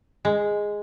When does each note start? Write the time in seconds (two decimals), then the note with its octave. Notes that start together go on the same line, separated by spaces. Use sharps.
0.25 G#3